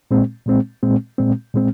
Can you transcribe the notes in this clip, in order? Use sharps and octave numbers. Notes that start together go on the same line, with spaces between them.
A#2 G#3 C4
A#2 G#3 C4
A#2 G#3 C4
A#2 G#3 C4
A#2 G#3 C4